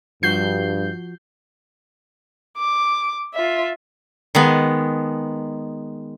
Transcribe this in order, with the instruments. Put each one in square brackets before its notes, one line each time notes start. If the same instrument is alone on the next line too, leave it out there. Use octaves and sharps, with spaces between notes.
[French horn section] G2 [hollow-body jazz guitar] F3 F#4 [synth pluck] G6 C7
[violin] D6
F4 E5
[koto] D#3 G#3 B3